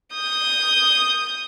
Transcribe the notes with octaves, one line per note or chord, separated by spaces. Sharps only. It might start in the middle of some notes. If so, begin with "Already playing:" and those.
D#6 G6